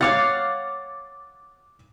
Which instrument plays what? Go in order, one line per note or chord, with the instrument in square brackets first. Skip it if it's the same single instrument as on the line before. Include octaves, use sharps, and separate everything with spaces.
[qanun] C#5 F5 F#5 [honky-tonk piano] D6 A6